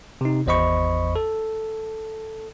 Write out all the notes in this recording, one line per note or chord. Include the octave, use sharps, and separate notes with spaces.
C3 D#4
G#1 E2 C5 D#5 B5 C#6
A4